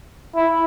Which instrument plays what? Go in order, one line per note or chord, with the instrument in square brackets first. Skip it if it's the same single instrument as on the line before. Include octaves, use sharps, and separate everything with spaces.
[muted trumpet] E4